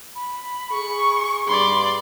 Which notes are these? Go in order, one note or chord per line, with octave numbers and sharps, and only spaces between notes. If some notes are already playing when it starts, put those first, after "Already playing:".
B5
G#4 C#6
G2 D5 B5 C6